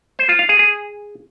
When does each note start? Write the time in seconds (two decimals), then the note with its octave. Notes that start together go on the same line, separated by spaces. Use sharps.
0.19 C5
0.29 F4
0.39 F5
0.49 G#4
0.59 G#4